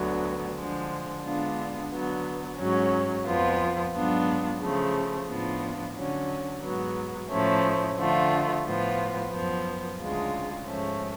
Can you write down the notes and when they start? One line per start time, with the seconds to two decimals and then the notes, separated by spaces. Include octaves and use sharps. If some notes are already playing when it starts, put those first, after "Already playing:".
Already playing: D2 D3 F#3 B3
0.56 D3 F3 G#3
1.23 D3 G#3 B3 D4 F4
1.91 D3 F#3 B3
2.57 G#2 F#3 C#4
3.25 F2 F3 B3 F4
3.92 G#2 F#3 B3 D4 F4
4.59 C#3 F3 A3
5.27 A2 F3 B3 D4 F4
5.94 D3 F#3 C#4
6.62 G#2 F#3 B3
7.29 A2 F3 A3 C#4
7.96 D3 F3 A3 F4
8.63 A2 F3 B3 F4
9.30 F#2 F3 B3
9.98 D2 C#3 G#3 D4 F4
10.65 G#2 F3 A3 C#4